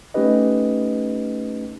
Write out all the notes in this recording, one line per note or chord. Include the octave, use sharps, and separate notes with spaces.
A3 C#4 D#4 G4 B4 D#5